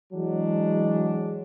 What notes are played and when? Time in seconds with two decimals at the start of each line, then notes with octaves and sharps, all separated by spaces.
0.13 E3 F#3 G#3 D4